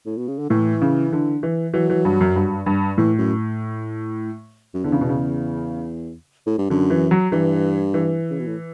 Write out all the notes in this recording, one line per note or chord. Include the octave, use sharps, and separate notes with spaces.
A2
B2
C#3
D3
A2 E3
C#3
D3
E3
E3 F#3
E3
G2
F#2
G2
G2
A2 E3
F#2
F#2
E2 D3
C#3
B2
C#3
A2
G2
F#2 D3
E3
F#3
G2 E3
E3
C#3
B2
A2